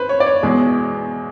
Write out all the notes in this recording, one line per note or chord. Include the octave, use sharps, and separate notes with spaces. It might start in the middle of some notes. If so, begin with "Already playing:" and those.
Already playing: B4 C5
C#5
D5
C#5
E2 B2 G#3